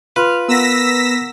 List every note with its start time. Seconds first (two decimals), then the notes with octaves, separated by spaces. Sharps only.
0.16 F4 B4 F6
0.48 B3 A#4 F#5 E6 A#6 B6